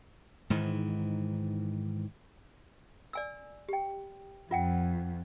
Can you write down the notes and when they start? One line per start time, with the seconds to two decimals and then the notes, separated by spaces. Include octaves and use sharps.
0.50 G#2 D#3 E3
3.13 D5 G#5 E6
3.69 G4 G5
4.51 F2 F4 F#5 G5